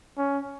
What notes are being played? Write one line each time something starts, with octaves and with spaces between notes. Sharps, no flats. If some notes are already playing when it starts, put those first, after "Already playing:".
C#4